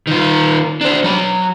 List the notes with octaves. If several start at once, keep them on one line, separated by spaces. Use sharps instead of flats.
D#3 F4
D4 C5
F#3 B5